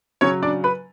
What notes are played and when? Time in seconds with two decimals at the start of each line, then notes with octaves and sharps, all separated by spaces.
0.21 C#3 F#3 C#4 C#5
0.43 D4 D5
0.64 B4 B5